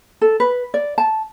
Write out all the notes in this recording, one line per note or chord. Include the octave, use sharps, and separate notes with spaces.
A4
B4
D5
A5